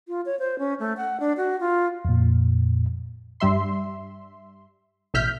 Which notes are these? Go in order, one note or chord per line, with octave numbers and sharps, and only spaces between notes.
F4
C#5
C5
C#4
A3
F#5
D4
F#4
F4
F2 A#2
G2 G3 E5 C6
A1 B2 E5 F6 G6 B6